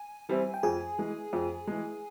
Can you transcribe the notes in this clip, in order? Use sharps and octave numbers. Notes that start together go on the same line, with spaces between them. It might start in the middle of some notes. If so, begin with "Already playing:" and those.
Already playing: G#5
E3 G3 C4 E4
G5
F2 G#4 G#5
E3 G#3
F2
E3 G#3